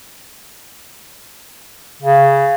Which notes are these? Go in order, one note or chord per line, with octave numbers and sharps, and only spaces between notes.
C#3